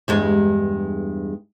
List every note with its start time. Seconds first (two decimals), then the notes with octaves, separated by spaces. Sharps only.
0.08 E2 G2 G#3